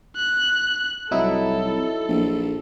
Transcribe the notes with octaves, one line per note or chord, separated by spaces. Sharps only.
F#6
C2 F#3 D#4 E4 A4
A#1